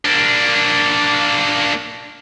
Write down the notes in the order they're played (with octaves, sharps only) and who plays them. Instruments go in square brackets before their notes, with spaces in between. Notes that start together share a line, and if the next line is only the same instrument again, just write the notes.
[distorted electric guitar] A#3 D4